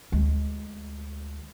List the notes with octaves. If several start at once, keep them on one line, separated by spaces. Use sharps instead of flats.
D2 G#3